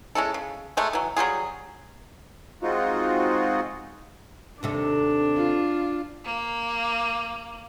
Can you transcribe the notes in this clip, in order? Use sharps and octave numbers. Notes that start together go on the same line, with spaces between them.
G#3 C#4 E4 A4
C#3
F#3 G#3 A3
E3 F#3
F#3 G3 F4 G#4
G#3 C4 D#4 F4 F#4
D#2 C3 D4 A4
F4
A#3